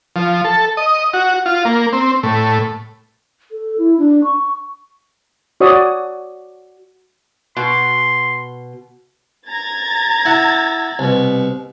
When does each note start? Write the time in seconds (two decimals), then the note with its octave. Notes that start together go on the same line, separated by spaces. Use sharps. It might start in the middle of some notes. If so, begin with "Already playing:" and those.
0.16 F3
0.45 A4
0.77 D#5
1.13 F#4
1.46 F4
1.65 A#3
1.93 C4
2.23 A2
3.51 A4
3.78 E4
3.98 D4
4.24 C#6
5.61 F#4 C#5 D5 D#6
7.56 B2 C6
9.47 A#5 G#6 A6
10.25 E4 F#5
10.99 C2 B2